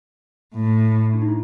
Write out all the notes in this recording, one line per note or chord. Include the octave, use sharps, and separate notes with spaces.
A2
D4
D#4
E4